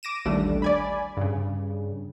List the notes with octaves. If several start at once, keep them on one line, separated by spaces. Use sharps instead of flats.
D6 A#6 D#7 E7
A1 D#2 G3 A3 D4
D5 G#5 B5
G2 C#3